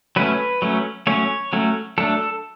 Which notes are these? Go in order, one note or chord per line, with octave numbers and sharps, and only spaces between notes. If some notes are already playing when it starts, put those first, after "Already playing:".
F#3 A3 C#4 B4
F#3 A3 C#4
F#3 A3 C#4 C#5
F#3 A3 C#4
F#3 A3 D4 A4